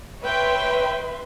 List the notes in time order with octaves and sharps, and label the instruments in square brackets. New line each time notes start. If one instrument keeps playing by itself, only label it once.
[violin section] B4 E5 C6 [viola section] C#5 G5